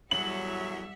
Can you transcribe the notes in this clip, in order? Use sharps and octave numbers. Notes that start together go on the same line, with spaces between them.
E2 A2 F#3 G3 E5 F#5 F#7